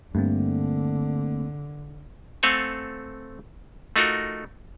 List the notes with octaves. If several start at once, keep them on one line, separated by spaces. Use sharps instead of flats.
G2 D3 A3 A#3 C4
A3 C4 A4 F5 F#5 G#5
A3 D#4 F4 F#4 A#4